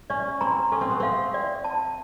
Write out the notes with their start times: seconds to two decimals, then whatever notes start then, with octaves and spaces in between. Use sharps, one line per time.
0.10 C#4 D5
0.41 C4 A#5
0.72 C#4 A4
0.81 C4
0.91 B3
1.00 C4 F5
1.34 D5
1.64 A5